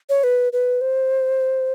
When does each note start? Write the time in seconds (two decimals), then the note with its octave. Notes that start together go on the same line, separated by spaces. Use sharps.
0.09 C#5
0.24 B4
0.53 B4
0.81 C5